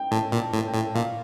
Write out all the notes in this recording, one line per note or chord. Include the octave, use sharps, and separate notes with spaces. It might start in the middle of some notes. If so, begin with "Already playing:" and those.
Already playing: G5
A2 A5
A#2
A5
A2
G5
A2
A#2 F5